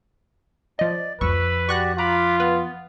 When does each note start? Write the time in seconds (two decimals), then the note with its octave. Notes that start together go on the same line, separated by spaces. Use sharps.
0.79 F3 D5 D#5
1.21 F2 F3 B4 C#6 E6
1.69 F#4 G4 D5 C#6 F#6 A#6
1.98 F4 A#5 B5 D6 F#6
2.40 B3 B4